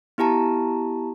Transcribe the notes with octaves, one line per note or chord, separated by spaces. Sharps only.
B3 E4 G4 A5 A#5